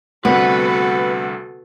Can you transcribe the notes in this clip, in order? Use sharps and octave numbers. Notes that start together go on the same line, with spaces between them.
D2 C3 G3 B3 F#4 A4 B4